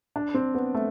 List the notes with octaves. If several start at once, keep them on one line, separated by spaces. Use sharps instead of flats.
D4
C4
B3
A3